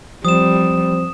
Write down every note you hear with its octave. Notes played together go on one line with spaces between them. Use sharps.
F3 G3 C4 C5 D#6 E7